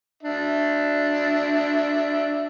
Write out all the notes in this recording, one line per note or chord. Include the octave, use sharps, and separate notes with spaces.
D4 E5